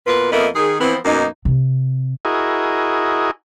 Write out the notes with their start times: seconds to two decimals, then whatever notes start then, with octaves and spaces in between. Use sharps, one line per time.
0.07 B2 A#3 F4 B4
0.32 F2 A#3 B3 D#5 E5
0.55 D#3 G#4
0.80 E3 F3 B3 C4
1.05 F#2 B2 A#3 D#4
1.45 C3
2.25 E4 F#4 G#4 A#4 D#5